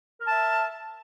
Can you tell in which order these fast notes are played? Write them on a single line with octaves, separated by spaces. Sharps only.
A#4 A5 E5